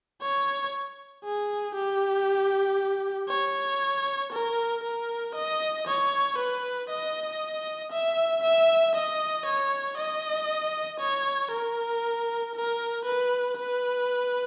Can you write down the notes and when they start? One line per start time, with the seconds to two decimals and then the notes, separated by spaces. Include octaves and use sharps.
0.21 C#5
1.24 G#4
1.75 G4
3.30 C#5
4.32 A#4
4.83 A#4
5.35 D#5
5.87 C#5
6.38 B4
6.90 D#5
7.91 E5
8.43 E5
8.95 D#5
9.46 C#5
9.98 D#5
11.00 C#5
11.51 A#4
12.55 A#4
13.05 B4
13.57 B4